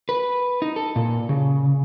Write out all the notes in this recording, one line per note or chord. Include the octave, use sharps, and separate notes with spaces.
B4
D#4
A4
A#2
C#3